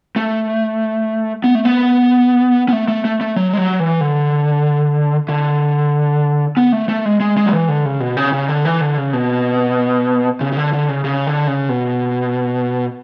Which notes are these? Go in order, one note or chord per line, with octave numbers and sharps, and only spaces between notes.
A3
B3
A3
B3
B3
A3
A3
A3
A3
F#3
G#3
F#3
E3
D3
D3
B3
A3
A3
G#3
G#3
G#3
F#3
E3
D3
C#3
B2
C#3
C#3
D3
E3
D3
C#3
B2
C#3
C#3
D3
D3
C#3
C#3
D3
C#3
B2